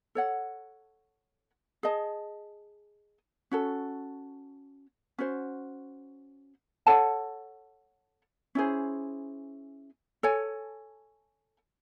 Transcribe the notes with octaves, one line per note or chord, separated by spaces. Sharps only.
A4 C#5 F#5
G#4 D#5 A5
C#4 F#4 A4
C#4 F#4 C5
A4 C#5 F#5 A5
C#4 E4 G#4 C5
A4 C#5 G#5